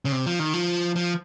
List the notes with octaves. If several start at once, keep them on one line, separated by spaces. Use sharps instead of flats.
C#3
C3
F3
D#3
F3
F3